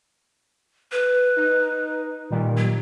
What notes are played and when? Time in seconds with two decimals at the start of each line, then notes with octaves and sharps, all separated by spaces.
0.92 B4
1.36 D#4
2.30 A#2 D#3 G3
2.57 F#3